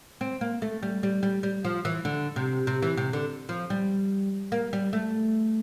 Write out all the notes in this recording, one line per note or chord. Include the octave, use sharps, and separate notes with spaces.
C4
A#3
A3
G3
G3
G3
G3
F3
E3
D3
C3
C3
E3
C3
D3
F3
G3
A#3
G3
A3